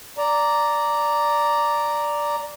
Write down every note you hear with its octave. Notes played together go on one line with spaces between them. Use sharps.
D5 A#5